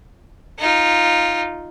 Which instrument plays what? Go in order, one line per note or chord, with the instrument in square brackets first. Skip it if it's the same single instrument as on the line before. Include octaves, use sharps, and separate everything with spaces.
[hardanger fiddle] D#4 F4